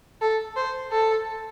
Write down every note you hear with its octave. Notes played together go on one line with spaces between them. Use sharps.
A4
C5
A4